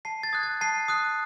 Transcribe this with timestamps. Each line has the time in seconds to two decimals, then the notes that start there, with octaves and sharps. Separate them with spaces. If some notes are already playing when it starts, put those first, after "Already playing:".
0.05 A5 C7
0.23 A6
0.33 D#6 F#6 G#6
0.43 A6
0.61 A5 C7
0.88 D#6 F#6